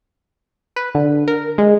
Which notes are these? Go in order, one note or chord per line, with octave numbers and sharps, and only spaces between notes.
B4
D3
A#4
G#3